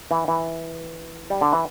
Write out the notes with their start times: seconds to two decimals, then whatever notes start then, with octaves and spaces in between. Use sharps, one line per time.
0.11 E3
0.28 E3
1.30 G3
1.41 D3
1.53 E3